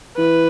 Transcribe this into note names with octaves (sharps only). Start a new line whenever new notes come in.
E3 B4